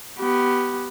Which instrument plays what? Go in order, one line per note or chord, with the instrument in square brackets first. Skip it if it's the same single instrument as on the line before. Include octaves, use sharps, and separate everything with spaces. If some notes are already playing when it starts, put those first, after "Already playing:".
[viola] B3 G4